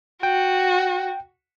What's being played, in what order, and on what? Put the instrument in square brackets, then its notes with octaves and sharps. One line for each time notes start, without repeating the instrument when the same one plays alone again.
[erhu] F#4 [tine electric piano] G5